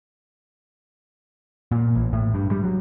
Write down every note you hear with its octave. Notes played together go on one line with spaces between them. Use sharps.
A#2
A1
A2
G2
G3
F#3